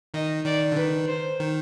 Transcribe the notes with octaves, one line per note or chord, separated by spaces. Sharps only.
D#3 D#5
D#3 D5
D3
D#3 B4
C5
D#3